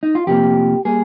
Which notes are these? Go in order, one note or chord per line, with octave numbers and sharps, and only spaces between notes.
D#4
F4
F2 C3 F3 A#3 G4
G3 A#3 G#4